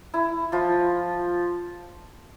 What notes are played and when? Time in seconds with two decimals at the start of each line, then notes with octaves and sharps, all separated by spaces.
0.14 E4
0.52 F3 F4